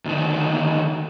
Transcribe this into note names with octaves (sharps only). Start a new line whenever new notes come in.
D2 D#3